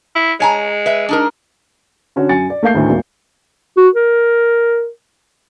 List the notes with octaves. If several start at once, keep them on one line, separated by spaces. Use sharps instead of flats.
E4
G#3 C#5 G#5 A#5
B4 E5
D4 D#4 A#4
D3 C#4 F#4 C#5
F#2 G#5 A6 C#7
D5
A3 A#3 F5 G6 C7
D2 A2 D#3
D#1 G#1 A#3
F#4
A#4